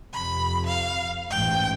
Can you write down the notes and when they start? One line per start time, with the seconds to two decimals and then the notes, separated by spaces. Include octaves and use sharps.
0.13 F2 C3 B5
0.66 F5
1.30 A1 G#2 G5